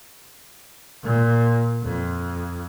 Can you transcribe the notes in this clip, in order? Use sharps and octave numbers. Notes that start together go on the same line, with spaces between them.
A#2
F2